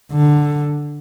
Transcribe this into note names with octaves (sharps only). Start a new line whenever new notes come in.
D3